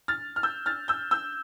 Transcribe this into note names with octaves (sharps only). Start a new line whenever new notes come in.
F6 A6
F6
E6 G6
F6 A6
E6 G6
E6 G6